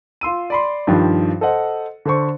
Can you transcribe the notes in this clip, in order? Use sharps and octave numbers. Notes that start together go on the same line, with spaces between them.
F4 C6 E6 D#7
D5 B5 C6
G2 D#3 F3
A4 C5 D#5 F#5
D3 A4 C5 C#6